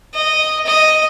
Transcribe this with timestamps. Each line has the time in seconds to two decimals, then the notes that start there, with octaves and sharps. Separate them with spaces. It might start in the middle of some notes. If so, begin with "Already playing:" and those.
0.15 D#5
0.66 D#5